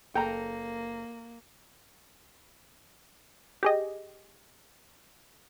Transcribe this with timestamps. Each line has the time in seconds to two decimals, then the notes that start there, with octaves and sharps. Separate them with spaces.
0.15 F#1 A#3 A4 G5 A#5
3.63 G4 G#4 D#5